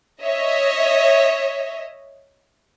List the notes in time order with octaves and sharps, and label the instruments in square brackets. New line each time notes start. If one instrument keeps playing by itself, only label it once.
[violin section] C#5 D#5 E5